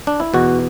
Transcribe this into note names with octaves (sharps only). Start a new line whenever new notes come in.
D4
E4
E2 B2 F#4